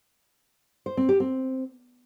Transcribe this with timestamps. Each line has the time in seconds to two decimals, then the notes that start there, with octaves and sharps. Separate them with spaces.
0.86 C5
0.97 C4
1.09 G4
1.20 C4